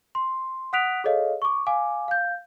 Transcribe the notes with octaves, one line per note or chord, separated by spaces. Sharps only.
C6
F#5 D#6 F#6 B6 D7 F7
G#4 A4 C#5 D#5 F5
C#6 D6
F5 G#5 D6
F5 G6